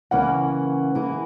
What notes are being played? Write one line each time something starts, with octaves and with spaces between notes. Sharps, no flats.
C#3 E3 A#3 C#4 F#5
E3 A#3 E4 G#4